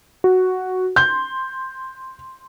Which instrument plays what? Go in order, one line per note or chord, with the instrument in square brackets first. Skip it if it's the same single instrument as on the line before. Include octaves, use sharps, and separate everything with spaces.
[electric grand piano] F#4
[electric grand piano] C6 [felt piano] G6